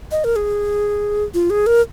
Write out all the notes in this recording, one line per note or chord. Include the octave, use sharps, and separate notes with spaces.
D#5
A#4
G#4
F4
G#4
A#4